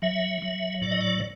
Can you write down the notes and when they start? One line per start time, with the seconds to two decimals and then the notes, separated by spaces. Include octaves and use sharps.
0.02 F#3 E5
0.42 F#3
0.82 A2 D5
0.91 D#5
1.01 D5